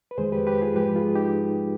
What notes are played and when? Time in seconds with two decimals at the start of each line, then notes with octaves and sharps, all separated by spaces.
0.11 B4
0.18 F2 D#3 G#3 G#4 C5
0.32 G4 B4
0.47 G4 B4
0.61 F4 G#4
0.76 G#2 F3 G#3 G4 B4
0.96 F4 G#4
1.15 D#4 G4